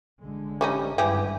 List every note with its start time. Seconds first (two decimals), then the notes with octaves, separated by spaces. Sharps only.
0.22 A1 D3 G#3
0.61 G3 C#4 D#4
0.98 G#1 G2 E3 G4 G#4